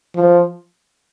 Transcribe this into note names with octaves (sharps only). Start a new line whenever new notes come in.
F3